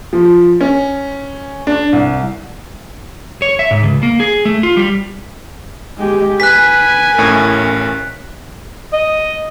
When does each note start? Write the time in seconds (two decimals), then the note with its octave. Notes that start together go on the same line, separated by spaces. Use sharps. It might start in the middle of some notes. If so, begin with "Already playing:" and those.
0.13 F3
0.61 C#4
1.67 D4
1.92 C2
3.42 C#5
3.59 E5
3.71 G#2
3.83 C#2
4.03 A#3
4.20 G#4
4.45 A3
4.63 F4
4.77 G3
5.98 G#3 G4
6.40 B4 G#5 F#6 B6
7.18 A1 A2 C#4 A#4
8.93 D#5